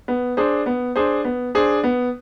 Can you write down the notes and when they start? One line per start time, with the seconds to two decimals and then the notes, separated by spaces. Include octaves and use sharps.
0.08 B3
0.37 D4 G#4 C5
0.66 B3
0.96 D4 G#4 C5
1.24 B3
1.55 D4 G#4 C5
1.84 B3